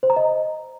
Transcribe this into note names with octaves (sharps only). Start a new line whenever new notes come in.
C5
A#5
D#5